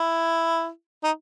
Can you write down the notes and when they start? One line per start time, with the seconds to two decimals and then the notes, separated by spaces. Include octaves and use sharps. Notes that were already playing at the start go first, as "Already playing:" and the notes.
Already playing: E4
1.04 D#4